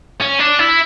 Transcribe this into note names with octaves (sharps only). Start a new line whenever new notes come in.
C#4
D4
E4